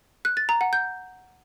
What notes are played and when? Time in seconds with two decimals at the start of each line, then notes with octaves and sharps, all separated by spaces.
0.25 F#6
0.37 A6
0.49 A#5
0.61 F#5
0.73 G6